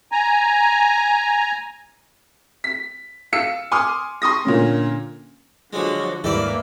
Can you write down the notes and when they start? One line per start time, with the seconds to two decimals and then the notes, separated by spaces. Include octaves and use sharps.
0.12 G#5 A#5
2.64 B6
3.32 F5 E6 C#7
3.71 G#5 C6 D6 D#6 F6
4.22 C6 C#6 D#6 A#6
4.45 A#2 D3 C#4
5.73 D3 F3 F#3 G#3 F#4
6.24 D#2 G#2 E3 G3 A#3 A4 D5 B5